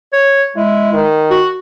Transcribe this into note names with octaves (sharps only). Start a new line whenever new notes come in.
C#5
G#3 E4
D#3
F#4